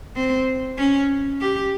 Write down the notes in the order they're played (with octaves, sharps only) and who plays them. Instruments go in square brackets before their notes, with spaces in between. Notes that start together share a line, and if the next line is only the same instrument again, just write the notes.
[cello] C4
C#4
G4